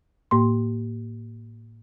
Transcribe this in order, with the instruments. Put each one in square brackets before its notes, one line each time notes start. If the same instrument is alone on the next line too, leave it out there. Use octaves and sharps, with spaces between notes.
[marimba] A2 A#3 C6